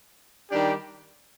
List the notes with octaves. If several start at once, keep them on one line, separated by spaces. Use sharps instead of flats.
D#3 G3 D4 G4